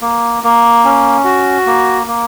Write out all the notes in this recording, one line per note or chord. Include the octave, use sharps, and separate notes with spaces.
A#3
A#3
C#4
F#4
A#3
A#3